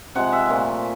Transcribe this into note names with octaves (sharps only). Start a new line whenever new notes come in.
C3 F3 G#3 F#5
E5
A#2 F3 A3